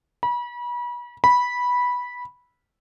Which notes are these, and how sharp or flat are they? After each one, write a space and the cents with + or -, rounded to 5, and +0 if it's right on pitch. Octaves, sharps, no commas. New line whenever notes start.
B5 -35
B5 -10